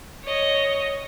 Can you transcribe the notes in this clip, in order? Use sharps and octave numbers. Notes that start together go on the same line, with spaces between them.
C#5 D#5